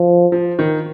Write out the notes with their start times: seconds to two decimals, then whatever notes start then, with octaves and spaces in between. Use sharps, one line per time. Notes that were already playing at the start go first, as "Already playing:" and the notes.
Already playing: F3
0.32 F3
0.59 D#3